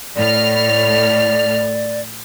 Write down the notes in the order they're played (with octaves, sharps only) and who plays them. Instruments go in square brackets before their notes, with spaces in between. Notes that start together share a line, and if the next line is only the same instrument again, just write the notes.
[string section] A2 F6 [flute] D5